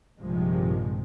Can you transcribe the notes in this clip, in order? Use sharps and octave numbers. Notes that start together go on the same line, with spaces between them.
A#1 G2 C3 D#3 F3 G#3